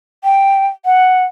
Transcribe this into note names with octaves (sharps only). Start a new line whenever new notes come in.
G5
F#5